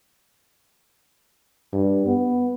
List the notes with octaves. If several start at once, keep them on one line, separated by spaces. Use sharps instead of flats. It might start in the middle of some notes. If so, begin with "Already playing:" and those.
G2
B3